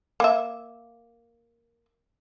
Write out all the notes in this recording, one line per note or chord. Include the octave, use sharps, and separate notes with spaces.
A#3 E5